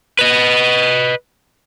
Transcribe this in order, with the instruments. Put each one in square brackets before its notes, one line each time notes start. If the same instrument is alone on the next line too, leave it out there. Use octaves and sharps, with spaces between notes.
[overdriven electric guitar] B4 D#5